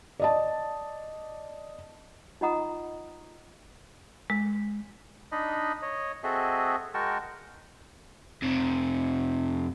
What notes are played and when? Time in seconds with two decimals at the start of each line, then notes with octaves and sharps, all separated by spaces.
0.20 D5 D#5 A5
2.41 D#4 F4 D#5 F#5 A#5 D#6
4.30 G#3
5.32 D4 D#4 D#5 B5
5.82 C#5 D#5
6.24 C4 F#4 G#4 A4 D#5 E5
6.94 G#3 F#4 A#4 G5 A5 C#6
8.43 F2 C3